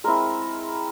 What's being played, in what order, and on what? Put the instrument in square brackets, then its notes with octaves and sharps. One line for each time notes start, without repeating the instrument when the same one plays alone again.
[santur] G#3 C4 E4 A#4